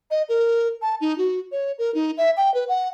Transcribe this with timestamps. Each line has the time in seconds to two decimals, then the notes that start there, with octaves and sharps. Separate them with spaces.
0.11 D#5
0.29 A#4
0.82 A5
1.01 D#4
1.18 F#4
1.52 C#5
1.78 A#4
1.94 D#4
2.17 E5
2.37 G5
2.54 B4
2.68 F#5